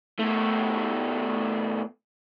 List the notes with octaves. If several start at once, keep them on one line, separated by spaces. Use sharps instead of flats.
B2 A3